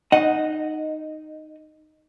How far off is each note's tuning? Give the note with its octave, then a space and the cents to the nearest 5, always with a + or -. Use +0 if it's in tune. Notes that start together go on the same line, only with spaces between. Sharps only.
D#4 -10 D#5 +0 F#5 +0